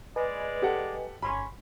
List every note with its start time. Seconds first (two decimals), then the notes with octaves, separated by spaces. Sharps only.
0.16 G#3 B4 D5 D#5 G#5
0.62 G4 A4 F#5
1.22 G1 C#4 B5 C6